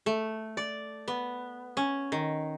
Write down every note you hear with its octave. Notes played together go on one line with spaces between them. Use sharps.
A3
D5
B3
C#4
D#3